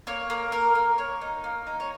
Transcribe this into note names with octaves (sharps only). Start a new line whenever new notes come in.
A#3 C#5
A#3
A#3 A#4
A#3
A#3 C#5
D#4
A#3
D#4
C#5